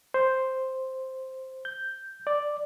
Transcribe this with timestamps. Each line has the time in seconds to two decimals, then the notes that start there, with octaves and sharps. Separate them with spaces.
0.14 C5
1.65 G6
2.27 D5